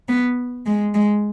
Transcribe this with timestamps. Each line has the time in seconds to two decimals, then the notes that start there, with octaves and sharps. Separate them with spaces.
0.09 B3
0.66 G#3
0.94 G#3